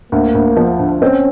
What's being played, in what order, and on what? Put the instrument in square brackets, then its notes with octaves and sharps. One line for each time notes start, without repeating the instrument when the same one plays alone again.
[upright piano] D2 [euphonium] A#3
[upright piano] D2
F3
D3
[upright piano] C4 [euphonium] C#4